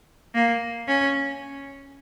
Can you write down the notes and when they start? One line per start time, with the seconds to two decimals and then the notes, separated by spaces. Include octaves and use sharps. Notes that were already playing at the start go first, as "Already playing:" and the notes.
0.35 A#3
0.88 C#4